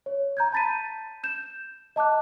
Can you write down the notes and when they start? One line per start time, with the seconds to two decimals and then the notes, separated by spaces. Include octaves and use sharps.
0.06 C#5
0.37 A#5 G6 G#6
0.52 A5 B5 A6 B6 D#7
1.23 G6 E7
1.96 D#5 A5 D6 F#6